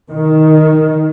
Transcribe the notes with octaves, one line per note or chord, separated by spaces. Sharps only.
D#3